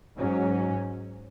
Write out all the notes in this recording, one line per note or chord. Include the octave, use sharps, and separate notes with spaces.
G#2 F#3 C#4